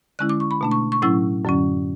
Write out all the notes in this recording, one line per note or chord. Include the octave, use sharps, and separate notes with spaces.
D3 G#3 C#4 E4 F#6
D6
C#6
B5
B2 A3 D4
C#6
C#6
A2 F#3 C#4 E4 E6
F#2 D3 F#3 C#4